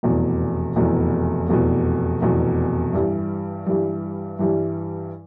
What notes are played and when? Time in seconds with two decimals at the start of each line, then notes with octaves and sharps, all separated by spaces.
0.03 F1 E2 B2
0.76 F1 E2 B2
1.48 F1 E2 B2
2.22 F1 E2 B2
2.93 G2 E3 G3
3.66 G2 E3 G3
4.39 G2 E3 G3